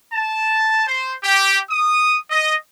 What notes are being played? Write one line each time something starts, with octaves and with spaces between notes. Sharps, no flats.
A5
C5
G4
D#6
D#5